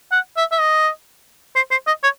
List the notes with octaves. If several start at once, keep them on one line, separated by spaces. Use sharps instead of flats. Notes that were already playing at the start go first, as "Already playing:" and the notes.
F#5
E5
E5
D#5
C5
C5
D#5
C#5